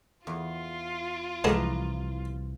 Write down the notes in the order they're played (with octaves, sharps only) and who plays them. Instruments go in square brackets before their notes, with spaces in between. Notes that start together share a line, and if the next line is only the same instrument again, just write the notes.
[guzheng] E2 [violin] F4
[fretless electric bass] C2 [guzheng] E3 F3 A#5 [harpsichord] G#3 B3 A4